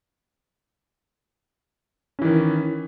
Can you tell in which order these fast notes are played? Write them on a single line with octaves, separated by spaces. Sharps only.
C#4 E3 D#3